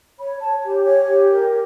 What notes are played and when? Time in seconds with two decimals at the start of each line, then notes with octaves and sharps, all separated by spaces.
0.18 C#5 B5
0.41 C#5 A5
0.62 G4 G#5
0.85 C#5 G#5
1.08 G4
1.30 A#4